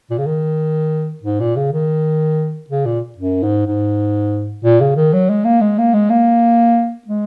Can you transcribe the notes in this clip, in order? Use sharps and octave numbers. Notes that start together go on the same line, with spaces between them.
A#2
C#3
D#3
G#2
A#2
C#3
D#3
C#3
A#2
F#2
G#2
G#2
A#2
C#3
D#3
F#3
G#3
A#3
G#3
A#3
G#3
A#3
G#3